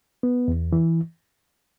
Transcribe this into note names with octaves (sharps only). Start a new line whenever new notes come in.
B3
E2
E3